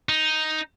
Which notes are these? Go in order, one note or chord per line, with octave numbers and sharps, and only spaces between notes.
D#4